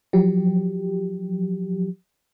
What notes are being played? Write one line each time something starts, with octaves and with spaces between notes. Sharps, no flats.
F3 F#3 G4